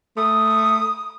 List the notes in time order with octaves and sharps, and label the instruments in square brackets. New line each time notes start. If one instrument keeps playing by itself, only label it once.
[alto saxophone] A3 [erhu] D#6